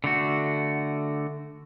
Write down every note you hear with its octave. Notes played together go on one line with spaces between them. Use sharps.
D3 A3 F#4